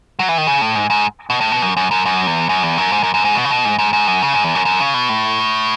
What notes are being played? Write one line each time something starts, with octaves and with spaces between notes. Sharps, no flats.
F#3
E3
D#3
C#3
A2
G#2
G#2
B2
A2
B2
F#2
F#2
F#2
F#2
E2
F#2
E2
F#2
G#2
F#2
F#2
G#2
B2
C#3
B2
G#2
G#2
G#2
F#2
C#3
G#2
E2
F#2
F#2
C#3
B2
A2